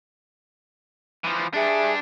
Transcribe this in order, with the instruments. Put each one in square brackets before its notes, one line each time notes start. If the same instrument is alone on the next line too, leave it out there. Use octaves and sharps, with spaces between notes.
[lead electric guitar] E3 F3
[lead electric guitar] G2 D4 [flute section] G#4 E5